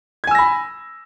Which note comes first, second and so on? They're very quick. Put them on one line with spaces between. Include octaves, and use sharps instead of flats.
G#6 G#5 E6 A#6 B5